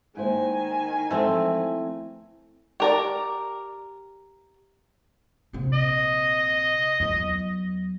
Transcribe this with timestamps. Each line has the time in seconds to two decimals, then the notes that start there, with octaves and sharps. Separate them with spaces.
0.17 D#3 G#3 A#3 E4 C5 G#5
1.11 E3 F3 G#3 A3 C4
2.80 G4 A#4 D5
5.53 A#1 C3
5.73 D#5
7.00 E2 F#3